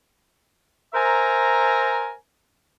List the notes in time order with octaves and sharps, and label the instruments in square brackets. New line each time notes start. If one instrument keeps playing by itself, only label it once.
[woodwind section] A#4 C5 E5 G#5 A#5